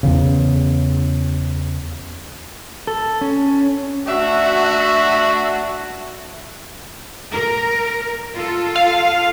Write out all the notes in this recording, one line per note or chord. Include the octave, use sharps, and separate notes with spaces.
E2 C#3
A4
C#4
A3 D4 F#4 E5
A#4
F4 A4
F5